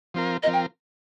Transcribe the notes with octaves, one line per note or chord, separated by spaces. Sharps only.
F3 C4 F4 A#4
F3 C4 F4 A#4 D#5
G5